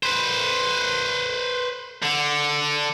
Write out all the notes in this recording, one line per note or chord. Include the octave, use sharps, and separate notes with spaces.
B4 C5
D3